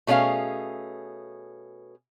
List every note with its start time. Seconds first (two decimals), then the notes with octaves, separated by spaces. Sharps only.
0.07 B2 A3 C#4 G#4 F5